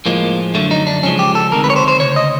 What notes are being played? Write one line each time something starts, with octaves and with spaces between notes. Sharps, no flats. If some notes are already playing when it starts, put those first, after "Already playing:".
A2 F3 G#3 A#3
F#2 D3 F#3 A3
D#4
D4
C#2 C#3 F3 G#3 C#4
G4
A4
D2 C3 D#3 G#3 A#4
B4
C#5
C5
C5
D2 C#3 C#5
D#5